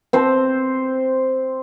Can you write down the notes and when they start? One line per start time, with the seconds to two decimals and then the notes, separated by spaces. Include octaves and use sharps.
0.13 C4 C5